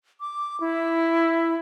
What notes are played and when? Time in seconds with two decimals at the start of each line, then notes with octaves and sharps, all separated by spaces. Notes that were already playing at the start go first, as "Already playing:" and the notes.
0.20 D6
0.60 E4